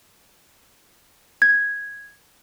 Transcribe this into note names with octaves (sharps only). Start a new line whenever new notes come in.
G#6